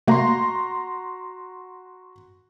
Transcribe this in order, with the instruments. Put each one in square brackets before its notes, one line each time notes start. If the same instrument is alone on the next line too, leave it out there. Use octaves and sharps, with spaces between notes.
[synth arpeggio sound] C3 A3 A#3 [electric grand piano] F#4 A#5 C6